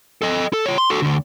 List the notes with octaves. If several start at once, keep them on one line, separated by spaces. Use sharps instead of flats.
A4 D#5
A4
F4 C#5
C6
F#4 A4
D2 D3